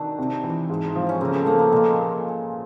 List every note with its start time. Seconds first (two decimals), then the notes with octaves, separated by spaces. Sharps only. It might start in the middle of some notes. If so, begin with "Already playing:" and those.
Already playing: D#3 C4 D4 F#4
0.18 C3
0.44 E3
0.70 G#2
0.95 F3
1.09 C#4
1.21 C#3 A#3 C4
1.34 A3 B3
1.46 F3 A#3 C4
1.59 A3 B3
1.72 A#2 G#3 A#3